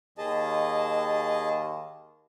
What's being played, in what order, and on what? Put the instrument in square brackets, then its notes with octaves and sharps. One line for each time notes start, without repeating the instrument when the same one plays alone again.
[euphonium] D#2 [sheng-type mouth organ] G#4 D#5 A5